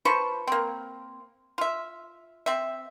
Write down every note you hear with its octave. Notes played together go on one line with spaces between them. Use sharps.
F3 B4 C5 C#6
A#3 C4
F4 E5
C4 E5